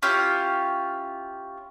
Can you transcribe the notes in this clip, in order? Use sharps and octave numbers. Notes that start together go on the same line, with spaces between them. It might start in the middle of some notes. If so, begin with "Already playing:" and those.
C#4 E4 F4 G4